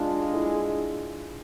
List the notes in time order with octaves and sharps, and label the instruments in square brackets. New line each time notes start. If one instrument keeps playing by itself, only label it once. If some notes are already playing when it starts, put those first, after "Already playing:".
Already playing: [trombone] G#3 [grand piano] D4 F4
[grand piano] F4
E4 G#4